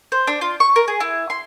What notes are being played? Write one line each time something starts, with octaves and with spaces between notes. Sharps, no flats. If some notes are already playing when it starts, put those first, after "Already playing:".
C5
D4
F4
C#6
A#4
G#4
E4
C6